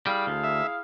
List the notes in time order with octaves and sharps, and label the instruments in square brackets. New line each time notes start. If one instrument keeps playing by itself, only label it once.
[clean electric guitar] G3 [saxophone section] E4 G#4 F5
[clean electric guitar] D2
[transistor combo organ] E5